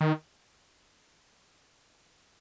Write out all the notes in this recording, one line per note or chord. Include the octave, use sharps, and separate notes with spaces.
D#3